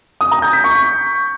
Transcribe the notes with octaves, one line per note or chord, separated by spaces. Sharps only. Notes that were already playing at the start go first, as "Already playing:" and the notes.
D#6
A#5
G6
B6
C#6